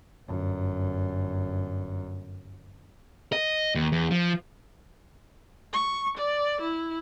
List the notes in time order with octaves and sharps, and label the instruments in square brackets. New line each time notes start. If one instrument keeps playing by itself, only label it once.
[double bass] G1 F#2
[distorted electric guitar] D#5
D#2
E2
F3
[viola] C#6
D5
E4